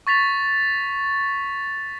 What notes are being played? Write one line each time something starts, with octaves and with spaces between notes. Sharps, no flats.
C#6 A6 B6 F7